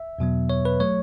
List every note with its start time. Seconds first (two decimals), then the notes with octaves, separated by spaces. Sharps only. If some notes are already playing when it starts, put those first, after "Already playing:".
Already playing: E5
0.19 E2 B2 F#3 B3
0.50 C#5
0.65 B4
0.80 F#3 A3 C#5